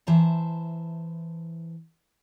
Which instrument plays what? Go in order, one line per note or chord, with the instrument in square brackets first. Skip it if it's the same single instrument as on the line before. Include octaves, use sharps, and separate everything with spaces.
[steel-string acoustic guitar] E3 C5 E5 A5 A#5